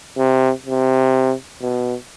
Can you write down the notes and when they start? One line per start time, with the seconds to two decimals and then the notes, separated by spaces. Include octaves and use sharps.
0.17 C3
0.66 C3
1.62 B2